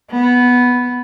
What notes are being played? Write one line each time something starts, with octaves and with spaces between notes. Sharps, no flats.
B3